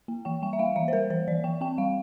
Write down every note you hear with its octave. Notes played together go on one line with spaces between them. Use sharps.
A#3
E3 G5
G3 G5
E5
A#3 F5
E3 E5
C5
G3 A#4
E3 C5
E3 D5
E3 G5
C4 G5
G3 F5